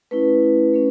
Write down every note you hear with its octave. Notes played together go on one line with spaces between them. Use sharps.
A3 C#4 E4 B4
A3 C#4